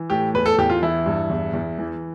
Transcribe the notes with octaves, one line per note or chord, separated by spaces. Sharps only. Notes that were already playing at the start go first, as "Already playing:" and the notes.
Already playing: E3
A2 G4
E2 B4
A4
E2 G4
F4
E3 E4
G2
E2
E2
E3